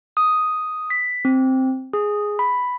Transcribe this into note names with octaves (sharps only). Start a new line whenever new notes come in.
D#6
B6
C4
G#4
B5